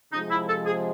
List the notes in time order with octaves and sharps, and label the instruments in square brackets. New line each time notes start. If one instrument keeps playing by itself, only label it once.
[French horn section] C3 F3 G#3 [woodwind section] D#4
[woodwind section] E4
A4
G#4